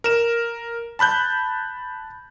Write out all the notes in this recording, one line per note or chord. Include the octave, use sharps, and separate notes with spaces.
A#4 E7
A5 B5 F#6 G6